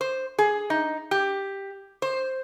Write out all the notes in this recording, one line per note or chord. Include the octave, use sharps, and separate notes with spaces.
C5
G#4
D#4
G4
C5